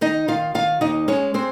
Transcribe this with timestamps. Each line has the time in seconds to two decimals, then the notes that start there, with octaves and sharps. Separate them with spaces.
0.01 D#3 D#4 D#5
0.28 D#3 F4 F5
0.54 D#3 F4 F5
0.81 D#2 D#4 D#5
1.08 G#3 C#4 C#5
1.34 G#3 C4 C5